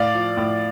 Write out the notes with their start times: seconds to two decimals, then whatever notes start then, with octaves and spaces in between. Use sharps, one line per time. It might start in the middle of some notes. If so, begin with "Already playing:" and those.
Already playing: A2 D5 F5
0.14 F3
0.37 A2